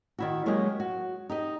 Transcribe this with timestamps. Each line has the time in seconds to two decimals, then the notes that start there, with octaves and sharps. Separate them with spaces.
0.18 D#3 E4 F#4
0.46 F#3 G#3 A#3 C#4 G4 D#5
0.80 F#4
1.29 D#4 G4 D#5